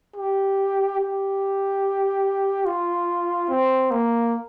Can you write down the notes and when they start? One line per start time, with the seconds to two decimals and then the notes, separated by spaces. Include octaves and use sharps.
0.16 G4
1.00 G4
2.66 F4
3.50 C4
3.91 A#3